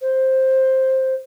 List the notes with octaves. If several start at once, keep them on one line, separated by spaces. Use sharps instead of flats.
C5